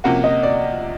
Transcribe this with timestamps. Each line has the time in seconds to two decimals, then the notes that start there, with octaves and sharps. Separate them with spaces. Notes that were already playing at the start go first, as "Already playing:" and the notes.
0.04 C3 F3 A#3 C#4 F#4 F#5
0.24 D#5
0.43 D5